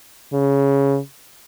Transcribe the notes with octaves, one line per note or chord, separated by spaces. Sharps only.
C#3